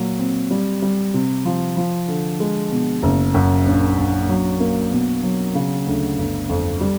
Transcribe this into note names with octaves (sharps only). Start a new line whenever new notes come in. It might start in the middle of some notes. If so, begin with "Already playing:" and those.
Already playing: A#2 F#3
C4
G3
G3
C3
F3
F3
D3
G#3
B2
F#1
F#2
A#1
A#1
F#3
A#3
B2
F#3
C#3
D2
G1
F2
G3